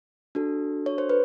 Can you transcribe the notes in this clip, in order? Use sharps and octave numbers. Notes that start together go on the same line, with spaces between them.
D4 F#4 A4
C#5
C5
B4